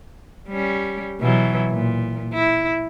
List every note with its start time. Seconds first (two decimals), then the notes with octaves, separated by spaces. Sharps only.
0.49 G3 C#4
1.21 B2 E3 F#3
1.71 A#2
2.34 E4